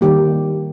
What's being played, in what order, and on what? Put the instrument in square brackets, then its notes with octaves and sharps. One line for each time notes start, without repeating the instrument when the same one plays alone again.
[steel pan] D#3 G3 A#3 G4